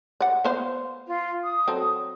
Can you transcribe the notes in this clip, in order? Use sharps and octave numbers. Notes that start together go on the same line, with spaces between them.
D5 F#5
B3 C5 F5
F4
D#6
F#3 C4 A4